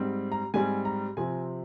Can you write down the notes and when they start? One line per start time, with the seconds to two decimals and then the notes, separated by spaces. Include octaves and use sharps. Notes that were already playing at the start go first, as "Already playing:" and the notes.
Already playing: G#2 G3 C4
0.32 A#5
0.54 G#2 G3 C4 G#5
0.85 A#5
1.17 C3 F3 C4 G#5